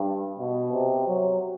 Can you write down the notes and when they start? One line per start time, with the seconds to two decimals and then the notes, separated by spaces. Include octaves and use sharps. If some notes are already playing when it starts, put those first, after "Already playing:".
Already playing: G2
0.39 B2
0.73 C3
1.07 F#3